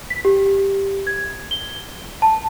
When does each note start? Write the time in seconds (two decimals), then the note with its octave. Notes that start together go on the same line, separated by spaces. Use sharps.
0.10 B6
0.25 G4
1.07 G#6
1.51 G7
2.22 A5